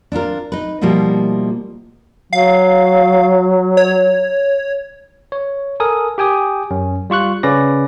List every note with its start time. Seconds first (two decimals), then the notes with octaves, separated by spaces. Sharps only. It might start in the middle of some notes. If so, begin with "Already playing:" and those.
0.12 D4 E4 F4 A#4
0.52 D#4 B4
0.81 B2 F3 G3 A#3 E4 F4
2.33 F#3 F5
3.77 C#5
5.32 C#5
5.80 A4 A#4 G#5 D#6
6.18 G4 G5 G#5 D#6
6.71 F#2 C#4
7.10 G3 F4 C#6 F#6
7.43 C#3 C#4 B4 D5 A#6